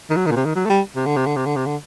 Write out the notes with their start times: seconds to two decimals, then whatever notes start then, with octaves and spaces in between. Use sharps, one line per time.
0.10 D#3
0.16 F#3
0.26 D#3
0.31 A#2
0.36 C3
0.46 D#3
0.56 F#3
0.66 A3
0.70 G3
0.96 C3
1.06 D3
1.16 C3
1.26 D3
1.36 C3
1.46 D3
1.56 C3
1.66 D3